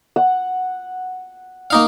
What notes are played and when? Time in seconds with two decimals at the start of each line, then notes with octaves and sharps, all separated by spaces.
0.16 F#5
1.70 A#3 D#4 F5